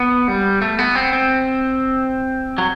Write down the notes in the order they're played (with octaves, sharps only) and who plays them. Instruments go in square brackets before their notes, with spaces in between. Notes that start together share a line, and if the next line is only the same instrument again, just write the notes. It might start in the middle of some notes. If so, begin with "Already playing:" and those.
Already playing: [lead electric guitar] B3
G3
A3
B3
C4
C4
F#3